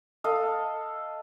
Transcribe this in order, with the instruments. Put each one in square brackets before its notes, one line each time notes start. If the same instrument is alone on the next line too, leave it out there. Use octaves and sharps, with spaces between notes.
[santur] A4 D#5 F5